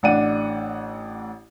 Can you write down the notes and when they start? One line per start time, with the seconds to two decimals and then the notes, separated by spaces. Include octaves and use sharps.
0.03 A1 D4 F#5 D#7